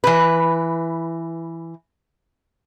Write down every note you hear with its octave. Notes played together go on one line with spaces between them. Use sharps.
E3 B4